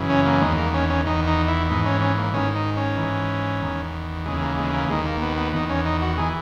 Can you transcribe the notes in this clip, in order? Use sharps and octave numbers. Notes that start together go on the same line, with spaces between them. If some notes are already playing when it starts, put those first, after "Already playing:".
Already playing: F#2 C#3 E3
C#4
A#3
E2 D#3 G#3
A#3
C#4
C#4
E2 D#3 D#4
D#4
E4
G#2 E3 D#4
C#4
C#4
A#3
G#2 D#3 C#4
D#4
C#4
G#2 E3
E2 D#3
D#2 C#3 E3 G#3
A#3
G#3
A#3
D#2 D#3 G#3
A#3
B3
B3
E2 D#3 D#4
C#4
D#4
F#4
E3 G#4